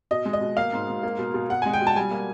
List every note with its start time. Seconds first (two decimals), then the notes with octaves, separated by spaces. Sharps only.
0.11 B2 D#5
0.26 G#3
0.33 D#5
0.41 B2
0.57 A#3 F5
0.73 G#2
0.88 G#2
1.03 A#3
1.19 B2
1.34 B2
1.50 B2 F#5
1.62 G#3 G#5
1.73 G5
1.81 B2
1.87 A5
1.96 G3 G#5
2.11 A#3